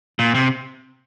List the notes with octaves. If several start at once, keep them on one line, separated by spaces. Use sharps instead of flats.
A#2
C3